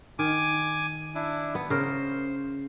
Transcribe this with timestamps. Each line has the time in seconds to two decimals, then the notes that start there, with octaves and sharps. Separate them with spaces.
0.19 D#3 G#5 D6
1.15 D4 E4
1.55 B3
1.70 C#3 A#4 C5